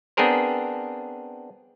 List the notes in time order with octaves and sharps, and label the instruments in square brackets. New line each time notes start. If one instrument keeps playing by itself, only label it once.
[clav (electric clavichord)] B3 C4 D4 G#4 A#4 C5